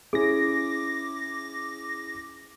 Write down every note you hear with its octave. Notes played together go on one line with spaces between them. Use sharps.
C#4 E4 G#4 D6 A#6